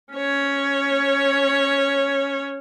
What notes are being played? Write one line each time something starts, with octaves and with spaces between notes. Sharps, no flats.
C#4 C#5